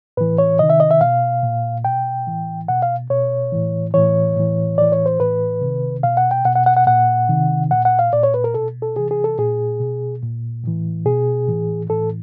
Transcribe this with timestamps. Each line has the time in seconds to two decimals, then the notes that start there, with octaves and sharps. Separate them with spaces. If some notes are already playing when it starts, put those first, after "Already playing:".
0.17 A2 E3 B4
0.38 C#5
0.59 C3 D#3 D#5
0.70 E5
0.80 D#5
0.91 E5
1.01 B2 F5
1.43 A#2
1.85 B2 G5
2.27 A2 E3
2.68 B2 F#5
2.82 F5
3.10 B2 C#5
3.52 A2 E3
3.94 A2 E3 C#5
4.36 A2 E3
4.78 A2 E3 D5
4.92 C#5
5.06 C5
5.20 A2 E3 B4
5.62 C3 D#3
6.03 B2 F5
6.17 F#5
6.31 G5
6.45 B2 F#5
6.56 F#5
6.66 F#5
6.77 F#5
6.87 A#2 F#5
7.29 C3 D#3
7.71 A#2 F#5
7.85 F#5
7.99 F5
8.13 A#2 D5
8.23 C#5
8.34 B4
8.44 A#4
8.54 B2 A4
8.82 A4
8.96 C3 E3 G#4
9.11 G#4
9.24 A4
9.38 A#2 G#4
9.80 B2
10.23 A#2
10.64 A2 E3
11.06 B2 G#4
11.48 A2 E3
11.90 A2 E3 A4